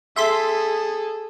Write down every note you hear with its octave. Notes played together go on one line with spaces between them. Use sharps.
G#4 A4 E5 C6 B6